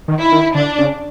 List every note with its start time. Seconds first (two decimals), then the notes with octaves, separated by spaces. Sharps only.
0.08 D#3
0.20 E4
0.32 D#3
0.55 D3 D4
0.79 C#3